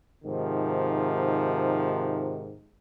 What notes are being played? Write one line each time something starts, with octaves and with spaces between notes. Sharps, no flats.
G#2 C3 D#3 F3